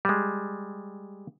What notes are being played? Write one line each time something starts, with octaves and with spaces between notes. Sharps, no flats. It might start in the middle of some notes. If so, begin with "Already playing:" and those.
G3 G#3